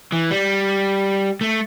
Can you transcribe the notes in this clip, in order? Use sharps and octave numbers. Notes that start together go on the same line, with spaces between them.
E3
G3
A3